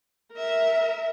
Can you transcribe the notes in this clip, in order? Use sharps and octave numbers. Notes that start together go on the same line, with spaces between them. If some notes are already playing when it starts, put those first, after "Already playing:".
A#4 E5